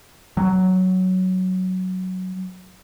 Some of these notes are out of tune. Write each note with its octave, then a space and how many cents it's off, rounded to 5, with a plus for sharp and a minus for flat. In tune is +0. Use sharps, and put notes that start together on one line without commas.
F#3 +5